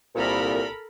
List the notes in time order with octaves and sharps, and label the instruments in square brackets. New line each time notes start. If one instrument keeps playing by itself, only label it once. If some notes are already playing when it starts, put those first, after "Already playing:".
[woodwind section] C2 A#2 [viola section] A4 A#4 B5